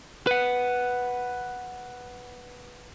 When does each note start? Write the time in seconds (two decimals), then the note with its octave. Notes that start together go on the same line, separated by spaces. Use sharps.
0.27 B4 F#5